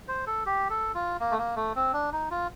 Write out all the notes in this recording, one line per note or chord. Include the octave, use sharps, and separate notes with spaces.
C5
A4
G4
A4
F4
A#3
A3
A#3
A3
C4
D4
D#4
F4